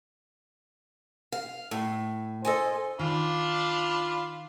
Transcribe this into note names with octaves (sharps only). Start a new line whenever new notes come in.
F5
A2
A4 C5 D#5 G#5
D#3 D4 F4 F5 B5